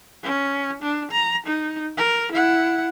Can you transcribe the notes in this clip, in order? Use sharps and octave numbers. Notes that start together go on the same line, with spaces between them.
C#4
D4
A#5
D#4
A#4
E4 F#5